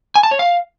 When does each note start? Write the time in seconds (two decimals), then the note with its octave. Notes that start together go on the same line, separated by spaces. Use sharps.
0.16 G#5
0.23 A5
0.31 C#5
0.39 F5